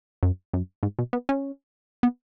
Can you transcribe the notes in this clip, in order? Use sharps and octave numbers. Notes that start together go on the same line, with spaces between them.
F#2
F#2
G#2
B2
B3
C#4
B3